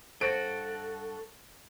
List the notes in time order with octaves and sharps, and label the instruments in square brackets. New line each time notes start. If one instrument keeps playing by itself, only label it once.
[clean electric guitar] G2 F#4 [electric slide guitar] A4 [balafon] C5 [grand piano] D7